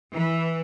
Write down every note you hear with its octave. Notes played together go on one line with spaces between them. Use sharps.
E3